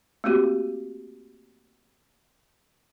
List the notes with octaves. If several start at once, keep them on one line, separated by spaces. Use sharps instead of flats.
A3 A#3 C4 F#4 G4